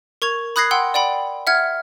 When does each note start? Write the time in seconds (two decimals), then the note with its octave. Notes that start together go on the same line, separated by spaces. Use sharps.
0.22 A#4 C#6 G#6 F7
0.56 B5 D#6 F#6 G#6 A#6 C7
0.71 F#5 G5 C6 E6
0.94 D5 F#5 G5 B5
1.47 E5 F#5 F6 G#6